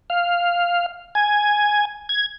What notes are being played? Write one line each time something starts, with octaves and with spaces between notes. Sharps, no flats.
F5
G#5
G#6